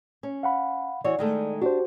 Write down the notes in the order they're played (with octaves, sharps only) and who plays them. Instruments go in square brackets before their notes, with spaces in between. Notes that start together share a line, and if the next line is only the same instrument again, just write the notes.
[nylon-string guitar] C#4
[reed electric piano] F5 F#5 B5
[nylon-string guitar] E3 F#4 C#5 [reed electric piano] D5
[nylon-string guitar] D#3 G#3 A3
[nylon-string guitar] D4 [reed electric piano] F#4 G4 C5